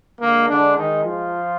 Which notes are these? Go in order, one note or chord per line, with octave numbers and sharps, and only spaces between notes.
D3 G#3 A#3
D3 D4
D#3 D#4
F3 F4